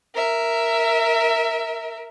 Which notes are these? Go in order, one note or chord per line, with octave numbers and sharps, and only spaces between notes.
A#4 E5